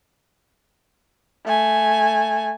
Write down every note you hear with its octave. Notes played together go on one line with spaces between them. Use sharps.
A3 G#5